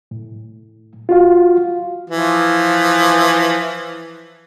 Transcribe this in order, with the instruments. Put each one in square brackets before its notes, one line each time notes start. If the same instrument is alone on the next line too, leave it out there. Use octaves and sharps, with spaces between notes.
[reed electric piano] A2
F4 F#4 F5
[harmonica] E3 F3